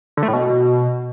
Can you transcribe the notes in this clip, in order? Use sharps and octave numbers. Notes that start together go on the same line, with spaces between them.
D3
A3
A2
B2